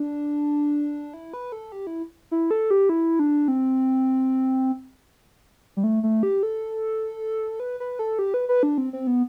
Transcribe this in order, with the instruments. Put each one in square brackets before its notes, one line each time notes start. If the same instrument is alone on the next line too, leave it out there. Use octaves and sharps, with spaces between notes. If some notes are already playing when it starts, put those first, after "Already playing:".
Already playing: [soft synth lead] D4
E4
B4
A4
G4
E4
E4
A4
G4
E4
D4
C4
G3
A3
A3
G4
A4
B4
B4
A4
G4
B4
B4
D4
C4
C4
B3